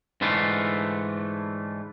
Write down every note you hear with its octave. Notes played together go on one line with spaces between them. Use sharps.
G#2 D3 E3 A3 F4